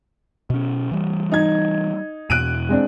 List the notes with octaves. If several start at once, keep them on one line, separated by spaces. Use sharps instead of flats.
B2 C#4
E3 G3
D#4 G#6
E2 B2 F#6 D7 D#7
G#3 C4 D4